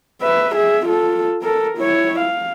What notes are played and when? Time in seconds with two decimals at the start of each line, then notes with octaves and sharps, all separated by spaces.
0.22 B4 E5
0.55 G#4 E5
0.86 F4 A4
1.42 A4 A#4
1.78 E4 C#5
2.19 F5